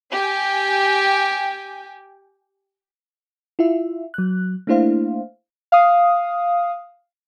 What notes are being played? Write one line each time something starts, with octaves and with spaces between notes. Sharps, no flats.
G4 G5 G#5
E4 F4 E5
F#3 F#6
A3 A#3 D4 E4 C5 F5
F5 D#6